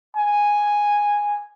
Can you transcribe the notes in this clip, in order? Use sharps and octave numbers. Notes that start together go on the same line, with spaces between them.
G#5